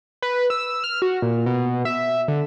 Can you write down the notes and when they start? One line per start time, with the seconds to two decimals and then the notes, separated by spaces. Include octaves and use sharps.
0.22 B4
0.50 E6
0.84 F6
1.02 F#4
1.22 A#2
1.46 B2
1.85 E5
2.28 D3